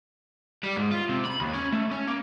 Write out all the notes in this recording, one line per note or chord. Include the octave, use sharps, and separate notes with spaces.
G3
G#2
F4
C3
B5
D#2
C#4
A3
C#4
A#3